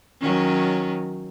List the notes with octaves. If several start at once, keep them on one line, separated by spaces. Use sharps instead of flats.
D#3 F#3 C#4